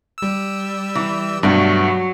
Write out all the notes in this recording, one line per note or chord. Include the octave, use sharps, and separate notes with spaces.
G3 E6
E3
G2 B2 F#3 A3 B3